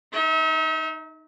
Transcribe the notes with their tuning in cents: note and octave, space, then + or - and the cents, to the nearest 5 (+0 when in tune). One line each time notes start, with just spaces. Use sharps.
D#4 +0 E5 -45